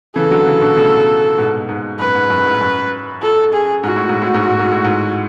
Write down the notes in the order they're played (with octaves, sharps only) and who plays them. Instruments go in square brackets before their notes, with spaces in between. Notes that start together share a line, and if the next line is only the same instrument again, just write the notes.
[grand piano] C#3 E3 [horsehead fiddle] A4
[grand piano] D3 F#3
C#3 E3
B2 D3
A2 C#3
G#2 B2
G#2
[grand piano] F#2 [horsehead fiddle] B4
[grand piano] G#2
F#2
A2
G#2
F#2
[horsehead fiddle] A4
G#4
[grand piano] G#2 [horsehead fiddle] F#4
[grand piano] A2
G#2
A2
G#2
A2
G#2
A2
G#2